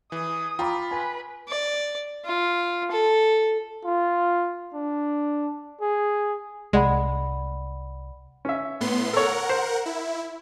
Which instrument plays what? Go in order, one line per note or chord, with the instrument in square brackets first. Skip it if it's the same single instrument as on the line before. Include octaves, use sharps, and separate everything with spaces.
[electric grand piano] E3 [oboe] G#4 [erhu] D#6
[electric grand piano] F4 [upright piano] G5 A#5 D6 [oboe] B5
[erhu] B4 [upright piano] G#5
[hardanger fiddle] D5
F4
A4
[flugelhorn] F4
D4
G#4
[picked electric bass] C2 [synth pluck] G#3 [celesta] D5 F#5 B5
[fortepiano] C#4 E5
[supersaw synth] A2 B3 C6
[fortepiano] A4 C#5 [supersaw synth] A#4 F#5
[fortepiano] C5
[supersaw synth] E4